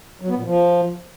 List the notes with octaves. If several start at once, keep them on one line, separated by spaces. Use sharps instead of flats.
F#3
B3
A#2
F3